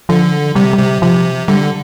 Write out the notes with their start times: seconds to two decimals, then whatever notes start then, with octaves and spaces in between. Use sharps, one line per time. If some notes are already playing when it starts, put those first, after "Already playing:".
0.09 D3 F3
0.55 C3 G3
0.73 G3
0.78 C3
1.02 C3 F3
1.48 D3 G3